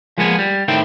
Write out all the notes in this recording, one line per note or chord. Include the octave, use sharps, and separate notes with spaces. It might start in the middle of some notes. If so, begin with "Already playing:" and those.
F3 G#3 A#3 B3 F4 G#4
G3
A2 D#3 C4 E4 G5